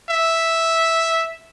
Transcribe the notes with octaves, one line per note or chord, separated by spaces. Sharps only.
E5